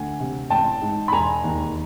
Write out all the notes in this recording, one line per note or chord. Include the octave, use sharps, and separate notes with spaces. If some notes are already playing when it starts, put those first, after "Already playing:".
Already playing: D2 F#5 G#5
C3
A1 G5 A5
G#2
B5
E1 G#5 A#5
D#2